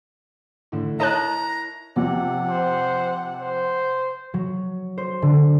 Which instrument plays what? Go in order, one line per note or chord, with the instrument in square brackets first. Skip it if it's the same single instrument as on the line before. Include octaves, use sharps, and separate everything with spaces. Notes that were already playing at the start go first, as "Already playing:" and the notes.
[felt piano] A2 D3
[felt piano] E4 A#4 C#5 [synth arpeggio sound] D#5 A5 F#6 [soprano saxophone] A#5
[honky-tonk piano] F2 C3 [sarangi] F#5
[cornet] C5
C5
[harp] F#3
C5
D3